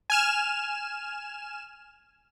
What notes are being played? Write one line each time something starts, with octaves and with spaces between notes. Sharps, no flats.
G#5 F6 E7